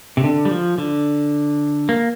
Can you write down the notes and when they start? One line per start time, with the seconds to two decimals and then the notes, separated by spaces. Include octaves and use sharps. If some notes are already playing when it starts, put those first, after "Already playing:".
0.17 C3
0.24 D3
0.45 G3
0.51 F3
0.78 D3
1.89 A#3